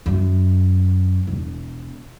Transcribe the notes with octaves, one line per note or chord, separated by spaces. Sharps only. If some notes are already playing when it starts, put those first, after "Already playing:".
F#2
E1